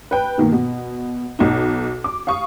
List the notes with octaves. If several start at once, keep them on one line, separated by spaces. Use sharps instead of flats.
B4 G5
B2 D#3 A#3
B2
B1 D#4
D6
F5 C#6 D#6